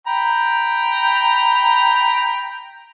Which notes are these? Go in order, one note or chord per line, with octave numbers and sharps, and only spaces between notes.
G5 A#5 B5